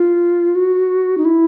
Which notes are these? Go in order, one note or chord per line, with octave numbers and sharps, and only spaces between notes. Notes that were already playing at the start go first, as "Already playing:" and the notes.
Already playing: F4
F#4
D#4
E4